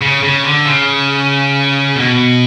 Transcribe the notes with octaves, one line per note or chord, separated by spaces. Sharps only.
C#3
C#3
D3
C#3
B2